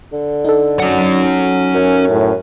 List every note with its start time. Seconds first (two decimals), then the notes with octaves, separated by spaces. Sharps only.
0.13 D3
0.45 D#4 A4
0.80 F#3 C#4 F#5
1.75 F#2
2.10 A2